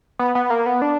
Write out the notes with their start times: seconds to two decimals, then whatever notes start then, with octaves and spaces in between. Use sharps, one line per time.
0.19 B3
0.35 B3
0.50 A#3
0.66 B3
0.82 D4